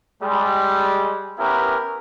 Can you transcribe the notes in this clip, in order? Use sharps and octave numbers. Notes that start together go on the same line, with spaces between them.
G3 G#3
B3 C#4 E4 G4 A#4 B4